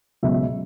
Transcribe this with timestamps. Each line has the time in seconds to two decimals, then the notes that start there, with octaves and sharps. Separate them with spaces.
0.23 C#2 B2 F#3 E5